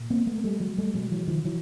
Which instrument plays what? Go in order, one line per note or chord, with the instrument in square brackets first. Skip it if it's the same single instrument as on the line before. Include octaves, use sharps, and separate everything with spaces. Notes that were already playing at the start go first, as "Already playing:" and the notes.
Already playing: [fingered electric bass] A#2
A#3 C4
A3 B3
A#3
G3 A3
F#3 G#3
G3 A3
B2 F#3 G#3
E3 F#3
D#3 F3
E3 F#3